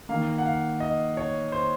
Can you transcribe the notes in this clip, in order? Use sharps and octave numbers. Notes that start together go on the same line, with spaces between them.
D#3 A#3 F5
F#5
F5
D#5
C#5
C5